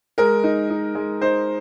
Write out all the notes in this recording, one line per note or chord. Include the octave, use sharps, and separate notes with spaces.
G#3 A#4
D#4
D#4
G#3
D#4 C5